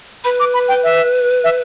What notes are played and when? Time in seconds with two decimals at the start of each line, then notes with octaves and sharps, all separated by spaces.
0.24 B4 B5
0.40 D6
0.54 B5
0.68 G5
0.84 E5
1.44 E5